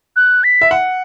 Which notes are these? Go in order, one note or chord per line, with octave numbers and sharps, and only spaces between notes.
F#6
B6
E5
F#5